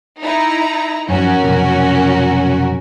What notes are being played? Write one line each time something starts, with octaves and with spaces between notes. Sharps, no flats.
D#4 E4 A#5
F#2 F3 C#4 F#4 A#4
B1 F2 C3